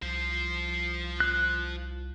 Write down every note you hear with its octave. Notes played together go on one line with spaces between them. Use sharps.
C2 F3 C5
F#6